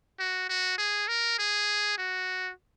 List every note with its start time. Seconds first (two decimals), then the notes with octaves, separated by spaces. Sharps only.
0.19 F#4
0.49 F#4
0.78 G#4
1.08 A#4
1.39 G#4
1.98 F#4